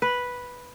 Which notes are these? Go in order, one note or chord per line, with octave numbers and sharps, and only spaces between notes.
B4